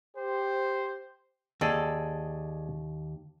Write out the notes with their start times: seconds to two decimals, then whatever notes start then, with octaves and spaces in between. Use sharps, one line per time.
0.17 G4 C5
1.61 D#2 G#4 A4 D5 D#5